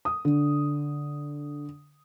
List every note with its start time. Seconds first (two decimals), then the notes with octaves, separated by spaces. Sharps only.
0.05 D#6
0.25 D3